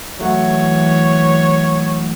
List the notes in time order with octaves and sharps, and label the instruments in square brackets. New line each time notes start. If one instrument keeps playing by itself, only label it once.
[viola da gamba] E3 [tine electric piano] F#3 A3 F#5 [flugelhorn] C#5